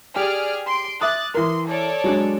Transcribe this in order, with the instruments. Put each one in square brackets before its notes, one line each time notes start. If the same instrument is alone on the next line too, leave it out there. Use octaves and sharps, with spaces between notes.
[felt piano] G4 [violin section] G#4 D5 F6
[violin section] C6 D7
[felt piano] E5 D6 D#6 [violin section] F#6 A6
[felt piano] E3 A#4 [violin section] C6
[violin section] A4 C#5 D5
[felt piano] F#3 G#3 D4